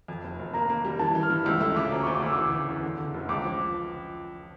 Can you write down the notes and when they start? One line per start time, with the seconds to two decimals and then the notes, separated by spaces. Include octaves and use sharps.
0.08 F2
0.24 F1
0.39 F1
0.54 A#3 A#5
0.69 A#3
0.85 G3
0.99 E3 A5
1.15 E3
1.23 F6
1.30 G2
1.45 C#2 E6
1.60 A3 E6
1.76 C#3 D6
1.92 D2 A#5
2.03 C#6
2.07 D2
2.14 D6
2.22 D2 E6
2.32 D6
2.37 E3 E6
2.53 C#3
2.69 E2
2.83 D3
2.98 D3
3.14 F1
3.29 C#2 D6
3.44 F3